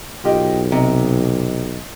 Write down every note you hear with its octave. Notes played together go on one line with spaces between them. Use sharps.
B1 F4 G4 D#5
C3 D#5 A#5